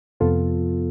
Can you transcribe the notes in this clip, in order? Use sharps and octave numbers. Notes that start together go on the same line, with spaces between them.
F2 C3 F3 B3 F4 A4